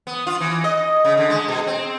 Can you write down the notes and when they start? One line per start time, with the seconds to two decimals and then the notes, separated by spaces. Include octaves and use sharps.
0.07 B3
0.27 F4
0.40 E3
0.64 D#5
1.05 C#3
1.17 D3
1.30 G#3
1.48 B2
1.67 C4